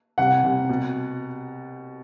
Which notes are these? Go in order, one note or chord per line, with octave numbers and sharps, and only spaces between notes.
C2 F#5
C2
B2